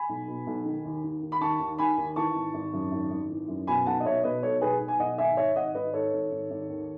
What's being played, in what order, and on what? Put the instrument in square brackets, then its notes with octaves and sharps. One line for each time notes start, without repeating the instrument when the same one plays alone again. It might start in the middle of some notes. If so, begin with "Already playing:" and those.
Already playing: [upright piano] G#5 B5
B1
B2
B1
D#3
D#2
D#2
D#2
B5
D#3 A5 C#6
D#2
D#3 G#5 B5
D#2
E3 A5 C#6
G#1
G#1
F#2
G#1
G#1
E3
F#2
B2 G#5 B5
B1 F#5 A5
D#5
B2 C#5 E5
B2 B4 D#5
B1 A4 C#5
B1 G#4 B4
B1
G#5
B1 D#5 F#5
G#1 E5 G#5
G#1 C#5 E5
G#1 D#5 F#5
G#1 B4 D#5
G#2 A4 C#5
G#1
G#1
G#1
D#2